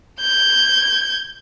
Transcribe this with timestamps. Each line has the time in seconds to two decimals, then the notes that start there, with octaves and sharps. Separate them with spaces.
0.21 G6 G#6